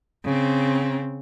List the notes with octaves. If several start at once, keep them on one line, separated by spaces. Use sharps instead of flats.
C#3 C4